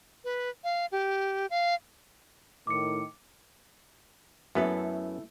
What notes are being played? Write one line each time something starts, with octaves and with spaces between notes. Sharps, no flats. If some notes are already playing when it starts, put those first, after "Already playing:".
B4
F5
G4
F5
A2 D#3 D6 C#7
F#2 F#3 A3 B3 E4 A4